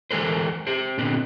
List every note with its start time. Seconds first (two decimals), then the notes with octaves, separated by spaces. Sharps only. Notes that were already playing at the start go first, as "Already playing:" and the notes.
0.11 E3 G#3 A4 A#4 C5
0.67 G4 C5
0.98 A#2 D3 B3 C4